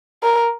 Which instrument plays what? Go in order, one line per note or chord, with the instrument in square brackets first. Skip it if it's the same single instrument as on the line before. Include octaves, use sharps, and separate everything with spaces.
[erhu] A#4